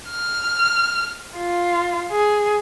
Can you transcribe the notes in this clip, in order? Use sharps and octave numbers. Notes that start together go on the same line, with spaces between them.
F6
F4
G#4